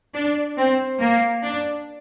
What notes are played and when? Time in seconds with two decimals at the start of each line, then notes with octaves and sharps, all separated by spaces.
0.15 D4
0.57 C4
1.00 A#3
1.43 D4